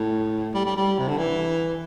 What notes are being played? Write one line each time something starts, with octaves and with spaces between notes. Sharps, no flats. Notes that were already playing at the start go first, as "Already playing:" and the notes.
Already playing: A2
G3
G3
G3
C3
D3
E3